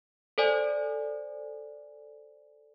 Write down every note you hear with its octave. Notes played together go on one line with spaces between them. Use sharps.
A4 C5 D5 G#5